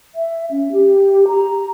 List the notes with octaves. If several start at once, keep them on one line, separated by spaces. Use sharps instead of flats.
E5
C#4
G4
A#5